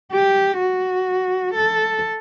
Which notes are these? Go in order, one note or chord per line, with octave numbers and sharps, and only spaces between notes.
G4
F#4
A4